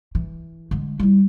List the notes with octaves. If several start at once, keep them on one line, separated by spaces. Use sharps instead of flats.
E3
D3 G#3
G3 E4